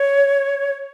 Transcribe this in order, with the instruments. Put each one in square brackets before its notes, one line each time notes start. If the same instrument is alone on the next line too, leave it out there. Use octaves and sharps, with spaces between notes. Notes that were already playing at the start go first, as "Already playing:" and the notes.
Already playing: [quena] C#5